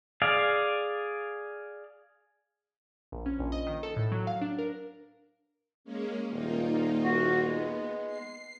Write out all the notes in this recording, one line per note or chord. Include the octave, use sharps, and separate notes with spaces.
G#4 D5 F5
A#1
C#4
A#1
D#5
D#3
A4
A2
F#3
F5
D4
A#4
G#3 A#3 C#4
D#1 A#3 D#4 F4
F#4
G#3 B3
C7